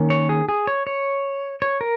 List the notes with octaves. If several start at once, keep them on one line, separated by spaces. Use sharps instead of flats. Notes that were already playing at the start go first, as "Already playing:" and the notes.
Already playing: D#3 A#3 C#4
C#5
G#4
G#4
C#5
C#5
C#5
A#4